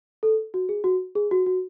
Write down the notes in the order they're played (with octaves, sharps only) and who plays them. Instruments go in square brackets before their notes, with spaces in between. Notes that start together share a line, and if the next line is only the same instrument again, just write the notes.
[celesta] A4
F#4
G#4
F#4
G#4
F#4
F#4